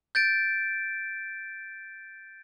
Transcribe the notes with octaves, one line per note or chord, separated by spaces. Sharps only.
G6 A6 D7